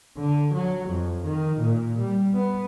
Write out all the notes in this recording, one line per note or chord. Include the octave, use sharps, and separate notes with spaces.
D3
F#3
F2
D#3
A#2
G3
B3